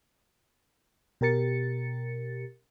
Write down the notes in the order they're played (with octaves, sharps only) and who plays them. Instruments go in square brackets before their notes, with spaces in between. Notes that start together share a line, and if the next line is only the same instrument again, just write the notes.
[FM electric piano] B2 G4 A#4 A6 C#7